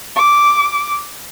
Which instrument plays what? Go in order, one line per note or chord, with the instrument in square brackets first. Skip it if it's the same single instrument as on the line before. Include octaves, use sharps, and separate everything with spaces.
[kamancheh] D6